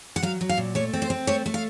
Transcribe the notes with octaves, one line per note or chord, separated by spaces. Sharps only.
F#5
F#3 F5
F#3
F5
A#2
A3 C#5
C4
C5
C4
A3 C#5
A3
F5